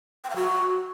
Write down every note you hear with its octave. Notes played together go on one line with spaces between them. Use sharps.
G5
F5
F#4